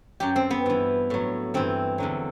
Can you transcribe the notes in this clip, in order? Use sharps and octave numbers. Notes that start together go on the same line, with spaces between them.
F#2 F#3 G4
C4
B3
G2 E3
A2 F#3
G2 E3 C4
E2 D3 F#3